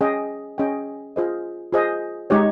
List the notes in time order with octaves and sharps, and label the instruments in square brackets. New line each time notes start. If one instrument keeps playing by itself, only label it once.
[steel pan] C#4 G#4 D#5 G5
C#4 G#4 D#5 G5
F4 G#4 C5 D#5
F4 G#4 C5 D#5
G#3 D#4 G4 C#5